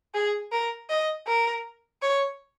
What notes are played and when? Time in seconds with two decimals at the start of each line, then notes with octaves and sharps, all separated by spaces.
0.14 G#4
0.52 A#4
0.89 D#5
1.27 A#4
2.02 C#5